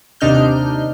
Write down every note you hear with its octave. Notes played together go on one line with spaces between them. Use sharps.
D#2 C3 D4 D#4 F6 G6